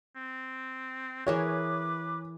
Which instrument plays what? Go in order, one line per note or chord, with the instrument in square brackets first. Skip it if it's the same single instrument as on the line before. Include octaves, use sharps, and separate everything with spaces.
[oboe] C4
[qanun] E3 G#4 A#4 [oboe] B4 [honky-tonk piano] C#5 [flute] D6